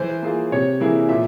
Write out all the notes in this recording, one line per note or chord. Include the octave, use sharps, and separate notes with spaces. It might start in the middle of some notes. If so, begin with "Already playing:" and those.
Already playing: E3 C5
A#3 F4 G#4
C3 C#5
E3 A#3 E4 G#4
A#2 E5